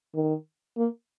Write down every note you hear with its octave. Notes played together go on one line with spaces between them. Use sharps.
D#3
A#3